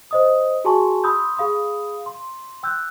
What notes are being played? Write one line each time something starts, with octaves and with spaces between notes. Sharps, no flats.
C5 D#5 D#6
F#4 G#4 G#5 A5 C6 C#6
B5 C6 D#6 E6 G6
G#4 F5 B5 D#6
C6
G5 E6 F#6 G6